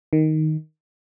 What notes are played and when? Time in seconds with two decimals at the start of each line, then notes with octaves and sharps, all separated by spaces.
0.13 D#3